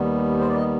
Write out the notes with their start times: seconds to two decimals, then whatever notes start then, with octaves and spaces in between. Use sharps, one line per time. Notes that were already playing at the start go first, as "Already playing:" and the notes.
Already playing: D#2 D#3 G3 B3
0.39 C5
0.47 D5
0.55 D#5